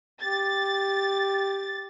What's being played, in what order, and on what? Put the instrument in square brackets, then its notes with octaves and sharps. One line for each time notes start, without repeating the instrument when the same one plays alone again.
[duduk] G4 [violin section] A6